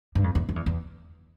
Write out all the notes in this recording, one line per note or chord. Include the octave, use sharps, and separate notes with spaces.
G2
F2
E2
F2
E2
E2